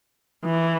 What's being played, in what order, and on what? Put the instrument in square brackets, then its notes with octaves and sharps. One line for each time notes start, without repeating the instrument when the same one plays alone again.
[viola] E3